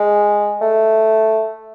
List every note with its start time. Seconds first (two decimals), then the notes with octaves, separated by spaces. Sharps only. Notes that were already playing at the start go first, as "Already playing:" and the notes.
Already playing: G#3
0.61 A3